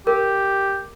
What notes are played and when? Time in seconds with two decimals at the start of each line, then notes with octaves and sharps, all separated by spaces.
0.07 G4 A#4